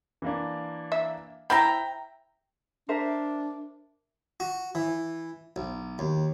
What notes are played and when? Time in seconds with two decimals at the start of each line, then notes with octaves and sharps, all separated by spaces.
0.22 E3 A#3 D4
0.92 E5
1.50 E4 C5 E5 G5 A#5 B5
2.89 D4 A#4 C5 E5
4.40 F#4
4.75 E3
5.56 B1
5.99 D#2